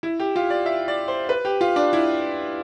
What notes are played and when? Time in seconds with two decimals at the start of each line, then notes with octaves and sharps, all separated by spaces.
0.03 E4
0.20 G4
0.36 F4
0.50 D5
0.66 E5
0.88 D5
1.08 C5
1.29 B4
1.45 G4
1.61 F4
1.76 D4
1.93 E4